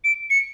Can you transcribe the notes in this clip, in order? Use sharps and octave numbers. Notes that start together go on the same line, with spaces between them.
D7
C#7